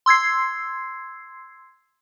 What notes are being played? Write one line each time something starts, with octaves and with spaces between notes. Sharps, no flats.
C6 E6 G#6 C7